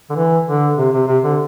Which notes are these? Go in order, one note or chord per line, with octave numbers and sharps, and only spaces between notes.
D3
E3
D3
C3
C3
C3
D3